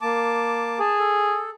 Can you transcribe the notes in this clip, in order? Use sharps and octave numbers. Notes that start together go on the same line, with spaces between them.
A#3 A5 D6
G#4 A5
A4